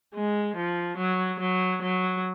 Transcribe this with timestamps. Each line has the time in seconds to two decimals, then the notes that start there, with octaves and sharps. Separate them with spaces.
0.14 G#3
0.56 F3
0.98 F#3
1.40 F#3
1.83 F#3